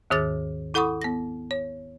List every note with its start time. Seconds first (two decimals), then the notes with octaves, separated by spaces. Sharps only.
0.10 D#2 G#2 D#3 G#4 D6 A6
0.74 E4 A4 F#5 B5 C#6 D#6
1.02 B3 A#6
1.51 C#5